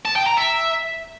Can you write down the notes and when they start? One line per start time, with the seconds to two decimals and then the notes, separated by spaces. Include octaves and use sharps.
0.05 A5
0.16 G5
0.26 A#5
0.37 E5